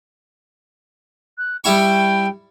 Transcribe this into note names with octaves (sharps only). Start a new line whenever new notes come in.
F#6
G3 E4 G5 C#6